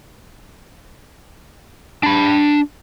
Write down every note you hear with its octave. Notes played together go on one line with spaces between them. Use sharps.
D4 B5